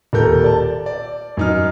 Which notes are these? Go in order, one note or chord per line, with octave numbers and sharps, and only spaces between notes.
D#1 A4 A#4 G6
D5 A5
D5
F#2 D#4 F6